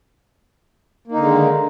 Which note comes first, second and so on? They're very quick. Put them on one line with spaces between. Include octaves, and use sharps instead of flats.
A#3 D#4 D3 G#3 D#3